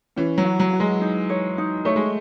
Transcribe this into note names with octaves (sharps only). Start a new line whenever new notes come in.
E3 C#4
F#3
F#4
F#3
F#4
G#3
D#4
C#5
D#4
A3 C#5
G#3